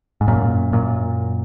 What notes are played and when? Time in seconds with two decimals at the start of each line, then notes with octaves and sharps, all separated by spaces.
0.21 G#2
0.27 F#2 A#2
0.73 F#2 A#2